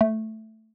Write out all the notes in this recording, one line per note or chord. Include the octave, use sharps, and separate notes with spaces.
A3